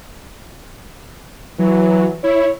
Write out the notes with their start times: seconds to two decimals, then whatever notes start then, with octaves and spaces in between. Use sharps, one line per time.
1.59 E3 F#3
2.24 E4 C#5